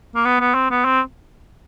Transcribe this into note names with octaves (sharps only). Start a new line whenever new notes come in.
A#3
B3
B3
C4
B3
C4